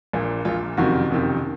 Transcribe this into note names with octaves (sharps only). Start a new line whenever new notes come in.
A#1 A#2
A#1 A#2 F4
F#1 F2 C3 D#3 F#4
F#1 F2 C3 D#3